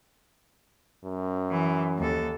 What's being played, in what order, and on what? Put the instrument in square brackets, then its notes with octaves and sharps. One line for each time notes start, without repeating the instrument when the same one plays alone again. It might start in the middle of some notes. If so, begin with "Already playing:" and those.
[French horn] F#2
[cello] E3
D#2 A4